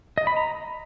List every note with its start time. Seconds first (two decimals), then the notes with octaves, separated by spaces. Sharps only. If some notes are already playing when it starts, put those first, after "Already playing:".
0.18 D#5
0.27 B5
0.36 A#5